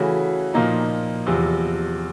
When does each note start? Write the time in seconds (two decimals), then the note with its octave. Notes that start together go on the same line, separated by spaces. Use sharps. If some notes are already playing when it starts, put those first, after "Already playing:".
Already playing: C#3 E3 A3 C#4 F#4
0.54 A#2 F3 A#3 D#4
1.26 E2 C3 F3